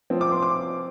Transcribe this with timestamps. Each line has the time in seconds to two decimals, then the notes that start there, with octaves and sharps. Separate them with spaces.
0.10 F3 C4
0.21 D6
0.32 C6
0.42 D6